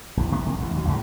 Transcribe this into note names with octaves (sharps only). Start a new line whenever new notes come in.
A#1 E2 E3
C3 E3 B3
F#1 C3 A#3
A1 E2 C3
D#2 A#2 F#3
E2 A2 C#3 G#3